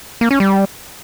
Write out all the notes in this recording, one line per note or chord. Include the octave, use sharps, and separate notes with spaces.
A#3
C#4
G3